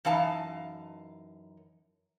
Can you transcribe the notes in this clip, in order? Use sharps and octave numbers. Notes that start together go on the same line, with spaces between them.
F#2 E3 D#4 F5 A5